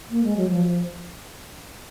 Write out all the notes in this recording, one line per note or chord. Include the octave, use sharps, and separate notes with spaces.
A#3
G#3
F#3
F3